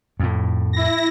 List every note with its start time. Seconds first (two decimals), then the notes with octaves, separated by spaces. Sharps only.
0.20 F2 A2
0.73 E4 A#6